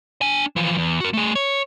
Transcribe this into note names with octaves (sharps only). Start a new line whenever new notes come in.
D4 G#5
E3 F3
E2
F#4 A#4
A3 G#4
C#5